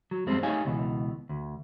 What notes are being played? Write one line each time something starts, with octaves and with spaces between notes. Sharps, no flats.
F#3
F#2 F3 G3 G#3 C4
A3 D#4 G4 C#5 F5 G#5
C#2 B2 E3
D2